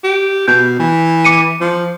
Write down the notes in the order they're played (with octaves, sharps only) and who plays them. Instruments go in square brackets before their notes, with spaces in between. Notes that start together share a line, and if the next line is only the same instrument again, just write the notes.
[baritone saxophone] G4
[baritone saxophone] B2 [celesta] G6
[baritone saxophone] E3
[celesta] D6 C#7 D#7
[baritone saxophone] F3